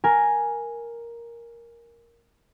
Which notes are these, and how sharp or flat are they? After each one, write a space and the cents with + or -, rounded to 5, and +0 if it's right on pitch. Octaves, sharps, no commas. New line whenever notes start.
A#4 +5 G#5 +0